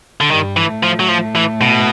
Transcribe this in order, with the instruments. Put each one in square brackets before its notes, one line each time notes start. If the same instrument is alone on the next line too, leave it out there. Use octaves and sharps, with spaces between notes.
[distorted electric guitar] D3
[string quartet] G2 G3 [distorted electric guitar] D#3
[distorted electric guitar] E3
[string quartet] A2 A3
[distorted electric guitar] F3
F#3
F3
E3
B2